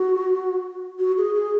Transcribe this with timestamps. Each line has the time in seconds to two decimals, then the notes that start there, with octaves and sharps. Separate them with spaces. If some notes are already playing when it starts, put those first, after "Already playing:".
Already playing: F#4
0.99 F#4
1.18 G#4
1.35 G#4